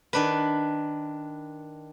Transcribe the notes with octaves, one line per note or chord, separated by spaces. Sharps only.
D#3 D4 B4